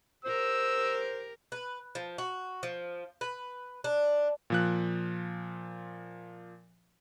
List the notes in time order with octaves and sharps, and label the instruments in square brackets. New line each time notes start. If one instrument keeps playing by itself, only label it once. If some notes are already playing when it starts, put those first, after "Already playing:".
[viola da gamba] G4 A#4 [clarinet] C5 [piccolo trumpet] E6
[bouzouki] B4
F3
F#4
F3
B4
D4
[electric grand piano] A#2 F3 F#6